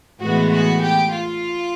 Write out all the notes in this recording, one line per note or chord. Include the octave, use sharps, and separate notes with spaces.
A2 E3 G#3 B3 F#4
F#4
G4
F4